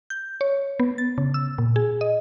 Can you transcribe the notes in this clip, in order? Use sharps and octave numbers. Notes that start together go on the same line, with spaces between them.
G6
C#5
B3
A6
C#3
E6
A#2
G#4
D#5